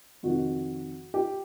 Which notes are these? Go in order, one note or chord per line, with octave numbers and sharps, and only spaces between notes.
F2 C3 D#3 F#4
G4